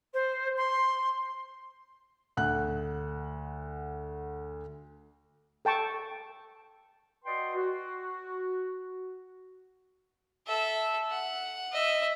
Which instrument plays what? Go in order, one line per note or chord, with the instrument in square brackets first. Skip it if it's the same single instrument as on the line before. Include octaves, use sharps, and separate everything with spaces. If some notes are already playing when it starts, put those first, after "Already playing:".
[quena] C5
C6
[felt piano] D2 F#5 F#6
[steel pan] A4 G5 A5 C#6
[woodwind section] F#4 B4 D5 D#5 G5 C6
F#4
[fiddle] A4 E5
F#5
D#5 E5